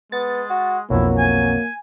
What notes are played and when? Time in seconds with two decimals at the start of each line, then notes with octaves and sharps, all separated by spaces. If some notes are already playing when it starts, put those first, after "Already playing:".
0.12 G#3 B3 A6
0.50 F#4
0.90 B1 F2 F#3 A#3 E4
1.18 G#5